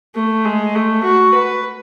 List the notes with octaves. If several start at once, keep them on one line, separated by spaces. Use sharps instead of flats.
A3
G#3
A3
F#4
B4